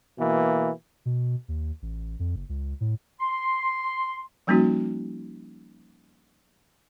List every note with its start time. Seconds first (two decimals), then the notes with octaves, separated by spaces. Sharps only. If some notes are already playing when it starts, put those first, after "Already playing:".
0.18 B2 E3 A#3
1.06 B2
1.48 D#2
1.82 A1
2.19 F2
2.36 F#1
2.49 C#2
2.81 A2
3.20 C6
4.47 F3 G3 A#3 C#4 D#4 F#4